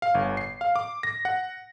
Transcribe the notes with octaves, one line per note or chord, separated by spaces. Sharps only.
F5
G1
C7
F5
D6
A#6
F#5